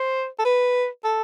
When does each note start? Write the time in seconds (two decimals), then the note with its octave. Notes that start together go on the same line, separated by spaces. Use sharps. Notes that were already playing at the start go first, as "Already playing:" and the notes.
Already playing: C5
0.39 A4
0.45 B4
1.04 A4